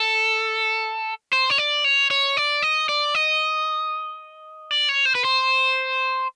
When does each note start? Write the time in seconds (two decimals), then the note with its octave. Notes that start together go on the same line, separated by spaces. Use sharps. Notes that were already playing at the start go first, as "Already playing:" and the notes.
Already playing: A4
1.33 C5
1.50 C#5
1.58 D5
1.84 C#5
2.11 C#5
2.37 D5
2.62 D#5
2.89 D5
3.15 D#5
4.71 D5
4.89 C#5
5.05 C5
5.15 B4
5.25 C5